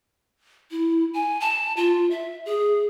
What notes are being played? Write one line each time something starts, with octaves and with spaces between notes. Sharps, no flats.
E4
G#5
A5
F4
E5
G#4